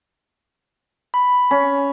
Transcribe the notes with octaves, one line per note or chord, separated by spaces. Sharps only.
B5
C#4